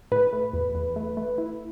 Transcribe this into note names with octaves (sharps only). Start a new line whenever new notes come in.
A2 B4
A3
E2
E2
A3
A3
E4